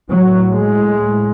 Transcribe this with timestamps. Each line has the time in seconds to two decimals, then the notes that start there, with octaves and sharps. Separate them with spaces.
0.12 A2 F#3
0.50 G#3